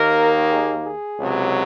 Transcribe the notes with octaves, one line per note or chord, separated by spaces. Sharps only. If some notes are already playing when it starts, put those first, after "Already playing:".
Already playing: D#2 D#3 A#3 A#4
G#4
G#4
C#2 C3 F#3